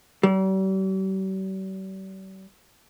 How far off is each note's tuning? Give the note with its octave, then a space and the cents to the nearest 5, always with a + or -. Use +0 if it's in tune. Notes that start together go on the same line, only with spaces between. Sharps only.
G3 -45